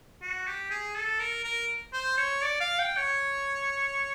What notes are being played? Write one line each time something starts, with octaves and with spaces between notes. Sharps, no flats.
F#4
G4
G#4
A4
A#4
A#4
C5
C#5
D5
F5
G5
C#5